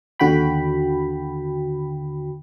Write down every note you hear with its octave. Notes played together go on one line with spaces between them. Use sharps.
D#2 D3 F#4 G5 B5